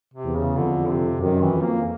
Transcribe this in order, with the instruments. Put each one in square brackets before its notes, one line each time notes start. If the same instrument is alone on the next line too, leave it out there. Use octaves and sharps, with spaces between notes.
[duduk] C3
[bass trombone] E2
[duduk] C#3
[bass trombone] F2 [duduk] D3
[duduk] C3
[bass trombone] F#2 [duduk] D#3
[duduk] E3
[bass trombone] F2
[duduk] A#3